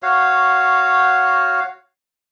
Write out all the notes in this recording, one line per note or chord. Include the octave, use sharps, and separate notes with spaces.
F#4 C#5 F5